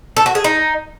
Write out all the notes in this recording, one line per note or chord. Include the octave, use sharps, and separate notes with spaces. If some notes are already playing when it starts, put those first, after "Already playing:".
A4
F#4
G#4
D#4